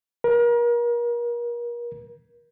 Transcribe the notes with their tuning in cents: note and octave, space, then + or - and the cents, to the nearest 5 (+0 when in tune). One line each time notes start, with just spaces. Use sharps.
A#4 +35